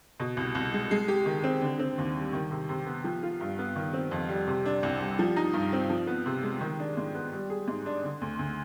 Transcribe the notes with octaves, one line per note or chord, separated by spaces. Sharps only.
B2
C2
C2
G#3
G#3
G4
D#3
C4
D3
C4
D#2
G3
D#3
C3
C3
B3
F3
F4
G2
B3
D#3
C4
F2
G3
C3
D4
C2
G3
F3
D#4
G2
C4
F3
B3
C3
G#3
D#3
D4
G#2
B3
G3
G#4
G#2
D4
D3
D2
D2